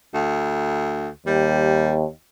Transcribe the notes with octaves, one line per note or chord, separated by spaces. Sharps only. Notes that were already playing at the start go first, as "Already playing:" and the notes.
D2
D#2 G3